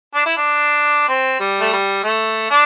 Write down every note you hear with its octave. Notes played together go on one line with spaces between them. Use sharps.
D4
E4
D4
C4
G3
A3
G3
A3
D4